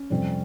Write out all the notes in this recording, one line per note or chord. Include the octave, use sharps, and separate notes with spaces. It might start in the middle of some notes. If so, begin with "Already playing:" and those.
Already playing: C#4
F2 C3 G3 C4